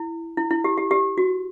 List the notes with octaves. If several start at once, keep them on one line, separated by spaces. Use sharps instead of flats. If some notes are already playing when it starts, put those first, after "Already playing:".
Already playing: E4
E4
E4
G4
G4
G4
F#4